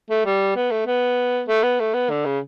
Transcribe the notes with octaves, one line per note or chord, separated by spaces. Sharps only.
A3
G3
B3
A3
B3
A3
B3
A3
B3
D3
C#3